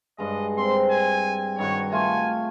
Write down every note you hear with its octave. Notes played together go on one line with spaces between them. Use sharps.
G2 G#3 D#5
C4 A#4 C6
G#5
G2 D#3 F#4 C#5
A3 F4 G#5